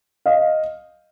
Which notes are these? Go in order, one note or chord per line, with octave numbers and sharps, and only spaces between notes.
D#5 F5